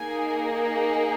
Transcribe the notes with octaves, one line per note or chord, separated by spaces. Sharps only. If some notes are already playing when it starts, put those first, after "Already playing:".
Already playing: A#3 D#4 G#4 G#5